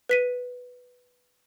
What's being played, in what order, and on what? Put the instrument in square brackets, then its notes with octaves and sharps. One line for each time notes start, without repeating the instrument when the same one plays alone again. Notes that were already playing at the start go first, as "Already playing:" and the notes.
[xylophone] B4 B6 D#7